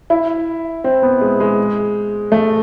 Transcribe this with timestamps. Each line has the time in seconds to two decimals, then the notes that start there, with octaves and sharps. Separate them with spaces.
0.10 E4
0.84 C4
1.02 B3
1.21 G#3
1.40 G#3
2.32 A3